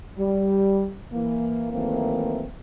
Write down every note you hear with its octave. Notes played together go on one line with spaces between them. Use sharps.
G3
E3 A#3
D#3 E3 F#3 A3 A#3 C4